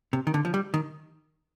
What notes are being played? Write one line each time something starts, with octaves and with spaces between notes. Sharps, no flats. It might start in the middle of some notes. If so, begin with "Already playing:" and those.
C3
D#3
D3
F3
G3
D#3